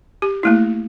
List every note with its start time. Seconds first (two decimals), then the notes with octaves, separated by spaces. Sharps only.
0.22 G4
0.43 A3 A#3 E4